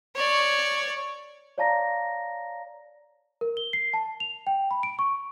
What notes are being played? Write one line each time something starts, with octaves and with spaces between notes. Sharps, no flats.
C#5 D5
C#5 D5 F5 A5 A#5 A#6
A#4
G7
C7
A5
F7
G5
B5
D7
C#6